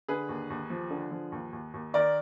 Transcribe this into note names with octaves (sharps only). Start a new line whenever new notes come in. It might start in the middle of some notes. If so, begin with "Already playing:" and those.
D3 G#4 B4
D#2
D#2
F3
D3
F3
D#2
D#2
D#2
D#3 A#4 D5